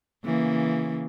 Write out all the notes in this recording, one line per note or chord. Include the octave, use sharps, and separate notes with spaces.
C#3 E3 A#3